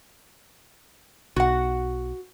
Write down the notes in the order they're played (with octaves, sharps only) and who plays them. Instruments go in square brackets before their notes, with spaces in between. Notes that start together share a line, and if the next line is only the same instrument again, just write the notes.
[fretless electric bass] B1 [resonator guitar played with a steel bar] F#4 F#5